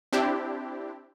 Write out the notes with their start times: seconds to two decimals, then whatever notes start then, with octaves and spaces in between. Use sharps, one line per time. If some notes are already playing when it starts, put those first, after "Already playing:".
0.13 C4 D4 E4 G4